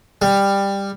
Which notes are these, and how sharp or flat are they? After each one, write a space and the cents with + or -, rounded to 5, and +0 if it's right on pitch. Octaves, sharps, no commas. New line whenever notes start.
G3 +15